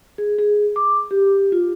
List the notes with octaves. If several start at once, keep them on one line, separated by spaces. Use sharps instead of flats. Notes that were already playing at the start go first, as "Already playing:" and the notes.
G#4
G#4
D6
G4
F4